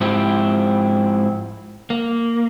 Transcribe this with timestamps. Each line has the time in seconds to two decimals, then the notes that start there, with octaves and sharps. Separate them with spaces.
0.01 G#2 F3 C4 E4 G4
1.90 A#3